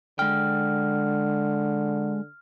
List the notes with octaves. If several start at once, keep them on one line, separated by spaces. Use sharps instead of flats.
D3 G#3 G5 F6